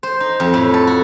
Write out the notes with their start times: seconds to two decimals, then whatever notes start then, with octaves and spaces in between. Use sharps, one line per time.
0.03 C5
0.20 D#4
0.40 F2
0.54 A2
0.74 A4
0.87 F#4